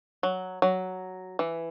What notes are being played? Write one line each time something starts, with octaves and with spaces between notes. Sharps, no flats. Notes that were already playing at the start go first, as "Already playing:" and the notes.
F#3
F#3
E3